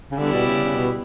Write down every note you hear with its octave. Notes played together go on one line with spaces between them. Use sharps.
C#3
D3 G3 B3 E4 G4 D5
B2
C#3
C#3
B2